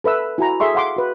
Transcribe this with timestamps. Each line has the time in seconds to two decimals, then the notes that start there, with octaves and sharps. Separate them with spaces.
0.04 A4 B4 E5 E6
0.38 E4 F#4 G#5 A#5
0.60 G#4 A4 E5 C6 C#6
0.75 F5 F#5 C6 D6
0.96 F#4 B4